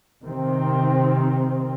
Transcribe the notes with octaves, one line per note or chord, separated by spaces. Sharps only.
C3 D#3 C4